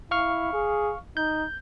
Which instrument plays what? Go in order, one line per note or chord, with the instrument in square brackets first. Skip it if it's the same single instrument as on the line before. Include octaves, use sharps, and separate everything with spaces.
[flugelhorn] E4 [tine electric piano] F5 C#6 F6
[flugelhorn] G#4
[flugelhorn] D#4 [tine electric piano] G6